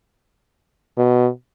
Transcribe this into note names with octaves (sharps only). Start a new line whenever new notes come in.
B2